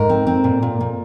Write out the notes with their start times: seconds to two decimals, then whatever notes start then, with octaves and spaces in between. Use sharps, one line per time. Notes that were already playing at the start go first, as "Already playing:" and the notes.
Already playing: G#2 A#4
0.09 C4
0.27 C4
0.44 A#2
0.62 A#2
0.80 A#2